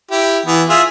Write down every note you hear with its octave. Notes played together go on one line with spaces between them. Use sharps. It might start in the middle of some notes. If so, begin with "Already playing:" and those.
E4 G4
E3 B3
F4 G#4 E5